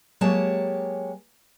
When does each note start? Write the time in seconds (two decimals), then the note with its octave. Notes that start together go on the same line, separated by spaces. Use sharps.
0.21 F#3 G#3 A#3 G4 C#5 A5